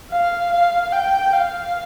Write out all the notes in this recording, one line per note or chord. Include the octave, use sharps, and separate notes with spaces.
F5
F5
G5
F5